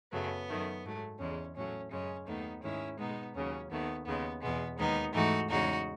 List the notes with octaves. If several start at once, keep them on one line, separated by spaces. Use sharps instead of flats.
F#2 C#3 F#3 A3 B3
F#2 D#3 A3
G#2 F#3 A3
E2 C#3 G#3 C#4
A2 F#3 A3 C#4
F#2 C#3 G#3 C#4
D#2 D#3 A3 B3 D#4
G#2 D#3 G#3 C#4 E4
B2 G#3 B3 D#4
D#2 C#3 F#3 C#4
D#2 D#3 A3 B3
D#2 C#3 G#3 B3
E2 B2 G#3 B3
D#2 D#3 G#3 B3 D#4
G#2 E3 A3 D#4 F#4
E2 C#3 G#3 D#4 F#4